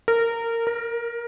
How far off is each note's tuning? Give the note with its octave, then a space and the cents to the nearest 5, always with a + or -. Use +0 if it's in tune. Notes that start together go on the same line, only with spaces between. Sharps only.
A#4 -20
A#4 +15